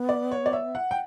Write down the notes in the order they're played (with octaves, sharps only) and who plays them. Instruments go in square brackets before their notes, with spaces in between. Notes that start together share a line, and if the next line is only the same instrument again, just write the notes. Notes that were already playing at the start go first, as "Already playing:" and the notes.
Already playing: [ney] B3
[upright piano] D5
C#5
D5
E5
F#5
G5